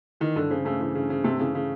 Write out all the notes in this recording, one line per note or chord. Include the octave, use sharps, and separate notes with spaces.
D#3 E3
G2 D3
C#3 C4
C#3 A3
C#3 E3
G2 C#3
C#3 C4
C3 A3
C#3 E3
C#3